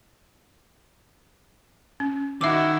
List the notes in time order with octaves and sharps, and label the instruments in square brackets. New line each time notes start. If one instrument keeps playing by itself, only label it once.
[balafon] C#4
[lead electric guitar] D#3 [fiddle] E4 F#4 [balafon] E5 D6 [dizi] E6